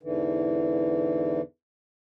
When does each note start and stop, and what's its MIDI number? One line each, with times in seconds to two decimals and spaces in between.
0.03 1.41 40
0.03 1.41 44
0.03 1.41 50
0.03 1.41 52